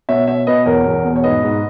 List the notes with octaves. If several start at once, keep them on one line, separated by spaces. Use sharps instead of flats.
B2 C#5 E5
B2 C#5 E5
B2 B4 D#5
E2 A#4 C#5
E2
B2
C#5
G#2 B4 D#5
G#2